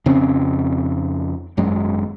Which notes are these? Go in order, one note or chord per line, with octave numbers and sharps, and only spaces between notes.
F2 C#3 C4 C#4
G#1 F#2 F#3 G#3